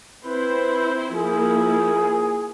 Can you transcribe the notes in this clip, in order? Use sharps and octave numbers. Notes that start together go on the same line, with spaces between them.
C4 E4 B4 C5
F3 A#3 E4 G#4